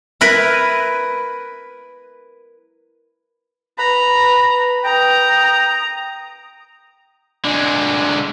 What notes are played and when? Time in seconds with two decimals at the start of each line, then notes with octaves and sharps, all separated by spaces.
0.21 E4 A#4 B4
3.78 B4 A#5 B5
4.85 G5 A#5 D#6
7.45 D3 G#3